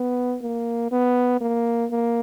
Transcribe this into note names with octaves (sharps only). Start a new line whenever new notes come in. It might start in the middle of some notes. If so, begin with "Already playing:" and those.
Already playing: B3
A#3
B3
A#3
A#3